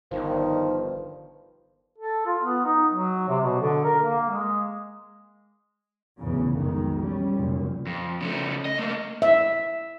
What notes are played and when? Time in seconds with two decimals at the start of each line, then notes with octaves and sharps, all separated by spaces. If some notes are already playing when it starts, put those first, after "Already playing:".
0.11 G1 D#3 F3
1.98 A4
2.26 F4
2.42 B3
2.65 D#4
2.90 F#3
3.28 C3
3.43 B2
3.61 D3
3.84 A#4
4.02 A#3
4.29 G#3
6.19 F1 B1 E2 A2 C#3 E3
6.55 B1 F2 D#3 G#3
7.02 G3 C#4
7.35 F1 C#2 F#2 A#2
7.87 F2
8.21 C#3 A3
8.65 D#5
8.79 A3 A#3
9.22 E5